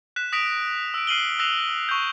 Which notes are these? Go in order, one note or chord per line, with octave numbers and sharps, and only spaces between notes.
F#6 B6 E7
D#6 A#6 B6 D7 E7 F7
E6 D7
F6 C7 D#7 F#7 G7
E6 F#6 A#6 C7 E7 F7
C#6 G6